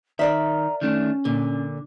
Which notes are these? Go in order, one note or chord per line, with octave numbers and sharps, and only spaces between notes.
D#3 A#4 D5 E5 A#5
D#3 A3 C#4 D4
A#2 D3